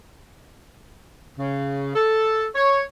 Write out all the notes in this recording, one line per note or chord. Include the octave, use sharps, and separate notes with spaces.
C#3
A4
C#5